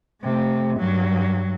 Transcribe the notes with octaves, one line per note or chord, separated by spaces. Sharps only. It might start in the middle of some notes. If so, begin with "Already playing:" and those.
C3 A3
G2 F#3